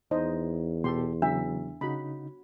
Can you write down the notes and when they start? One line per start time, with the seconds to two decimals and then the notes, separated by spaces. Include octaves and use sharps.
0.11 E2 D#4 C5 D#5
0.84 B2 G4 A4 C6
1.22 C#3 F#3 D4 E5
1.81 C#3 D#4 F#4 B5